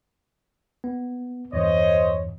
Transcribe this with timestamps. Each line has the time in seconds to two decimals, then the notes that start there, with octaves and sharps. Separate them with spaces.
0.84 B3
1.53 E2 G2 E3 C5 C#5 D#5